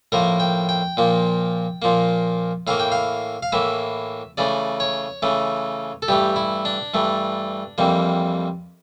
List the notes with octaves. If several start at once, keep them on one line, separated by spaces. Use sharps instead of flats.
A2 F3 A#3 A#4
G5
G5
A#2 F3 A#3
A#2 F3 A#3
A2 E3 A#3 F5
G5
F5
F5
A2 E3 A#3 E5
C#3 E3 A3 D5
C#5
C#3 E3 A3
A4
G2 E3 A3 G4
E4
D4
G2 E3 A3
F2 E3 G3 A#3